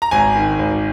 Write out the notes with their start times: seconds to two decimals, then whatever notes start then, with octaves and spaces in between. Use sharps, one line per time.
0.02 A#5
0.11 G#1 G#5
0.35 D#3
0.59 G#1